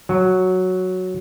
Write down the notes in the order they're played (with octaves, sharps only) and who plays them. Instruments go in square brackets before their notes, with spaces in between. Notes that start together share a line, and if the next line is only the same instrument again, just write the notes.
[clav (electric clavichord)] F#3